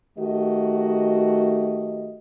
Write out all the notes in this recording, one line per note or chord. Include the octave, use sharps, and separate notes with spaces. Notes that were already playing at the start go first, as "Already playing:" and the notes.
D#3 A3 F#4 G4 D#5